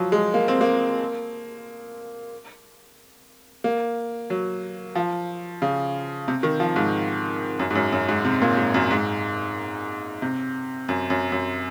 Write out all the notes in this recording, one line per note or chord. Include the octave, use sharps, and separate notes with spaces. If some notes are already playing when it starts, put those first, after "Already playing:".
Already playing: F3 F#3
G#3
A#3
C4
A#3
A#3
F#3
F3
C#3
C3
D#3
F3
G#2
F#2
G#2
F#2
F#2
G#2
C3
A#2
G#2
F#2
G#2
C3
F#2
F#2
F#2